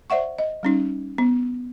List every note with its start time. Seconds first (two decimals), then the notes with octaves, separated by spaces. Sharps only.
0.10 C5 D5 E5 F#5 C#6
0.39 D#5
0.63 G3 C#4 D#4
1.18 B3